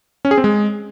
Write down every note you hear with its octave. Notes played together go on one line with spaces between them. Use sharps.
C#4
G#4
C4
G#3